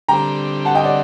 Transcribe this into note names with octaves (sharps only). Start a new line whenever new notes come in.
D3 G3 C4 G5 A#5
F#5 A5
D#5 G5
D5 F#5